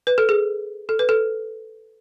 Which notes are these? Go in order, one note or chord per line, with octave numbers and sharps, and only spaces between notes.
B4
A4
G#4
A4
B4
A4